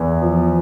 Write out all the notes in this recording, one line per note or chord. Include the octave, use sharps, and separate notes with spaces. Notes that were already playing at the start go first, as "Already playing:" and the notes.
Already playing: E2
F3